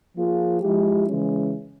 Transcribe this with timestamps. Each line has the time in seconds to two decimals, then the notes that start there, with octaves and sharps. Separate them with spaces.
0.16 F3 A#3 F4 G#4
0.62 F3 G#3 E4 G4
1.08 C#3 E3 G#3 C#4